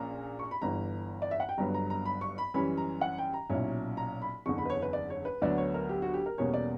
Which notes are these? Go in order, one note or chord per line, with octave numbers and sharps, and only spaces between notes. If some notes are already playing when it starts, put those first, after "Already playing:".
Already playing: A#1 A#2 A#3 C#4 A#5
C#6
B5
G1 G2 E3 A#5
D5
E5
F#5
G5
G1 G2 F#3 B3 A#5
A#5
A#5
B5
C#6
B5
F#2 E3 G3 C#4 B5
A#5
F#5
G5
A#5
B1 A#2 F#3 C#4 E4
A#5
B5
F#1 E2 D3 C#6
B5
B4
C#5
B4
D5
C#5
B4
D2 D3 F#3 B3 D4 D5
C#5
A#4
G4
F#4
G4
A#4
E2 B2 G3 A#3 C#4 C#5
D5